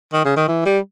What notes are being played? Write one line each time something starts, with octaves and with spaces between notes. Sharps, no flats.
D#3
C#3
D#3
E3
G3